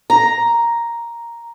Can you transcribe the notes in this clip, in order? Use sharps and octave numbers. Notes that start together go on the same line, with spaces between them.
A#5